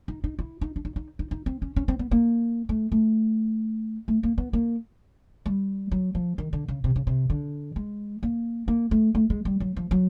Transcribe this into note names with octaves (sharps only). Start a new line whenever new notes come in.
D#4
D#4
E4
D#4
D4
D#4
D#4
D#4
D#4
C4
C#4
C#4
C4
B3
A#3
A3
A3
A3
A#3
B3
A#3
G3
F#3
F3
D#3
D3
C#3
C3
C#3
C3
D3
G#3
A#3
A#3
A3
A3
G#3
G3
F#3
F3
F#3